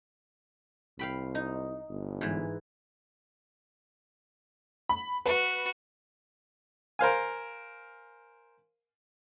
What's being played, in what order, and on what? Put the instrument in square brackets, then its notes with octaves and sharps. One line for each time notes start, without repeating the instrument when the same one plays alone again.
[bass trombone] C2 [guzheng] F5 G5 B5
[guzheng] D#4
[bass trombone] G1
[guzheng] G#2 E3
[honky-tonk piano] B5
[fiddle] F#4 [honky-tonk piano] B4
[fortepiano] A#4 C5 F5 G#5